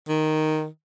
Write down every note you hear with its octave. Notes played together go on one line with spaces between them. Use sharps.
D#3